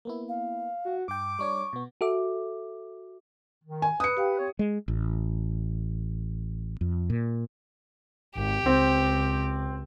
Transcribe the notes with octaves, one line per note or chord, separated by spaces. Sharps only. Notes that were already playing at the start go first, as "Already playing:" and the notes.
A#3 B3 E4
F5
F#4
G2 G5 D6
G3 D4 C#5 C#6
B2 B3
F#4 A4 E5 D6
D#3
G#5
B4 D#6 C#7
G4 F5 G5
C4 C#5
G#3
A1
F2
A#2
G#1 G4
C#2 C4